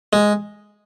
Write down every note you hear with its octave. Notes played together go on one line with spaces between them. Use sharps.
G#3